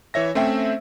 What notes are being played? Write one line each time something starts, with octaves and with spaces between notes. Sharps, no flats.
E3 C#5 E5 A#6
A3 C4 C#4 C5 E5 G5